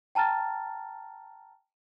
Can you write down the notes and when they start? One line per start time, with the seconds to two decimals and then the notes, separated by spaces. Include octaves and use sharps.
0.15 G5 A5 A#5 F6 A6